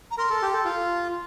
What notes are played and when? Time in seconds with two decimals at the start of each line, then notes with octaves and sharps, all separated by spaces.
0.11 A#5
0.18 A#4 C6
0.30 A4
0.42 G4
0.53 A4
0.65 F4